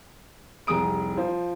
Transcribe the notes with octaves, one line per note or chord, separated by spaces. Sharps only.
F1 C2 G#4 D#6 D7
F3 C5